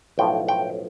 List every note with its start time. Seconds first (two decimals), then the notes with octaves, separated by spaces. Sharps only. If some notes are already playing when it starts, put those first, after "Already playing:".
0.18 B1 A2 F3 G5
0.49 G5